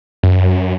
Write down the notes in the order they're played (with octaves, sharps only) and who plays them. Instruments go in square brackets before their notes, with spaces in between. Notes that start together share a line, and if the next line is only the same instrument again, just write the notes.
[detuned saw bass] F#2